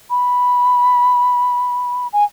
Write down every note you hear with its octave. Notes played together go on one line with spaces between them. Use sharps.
B5
G#5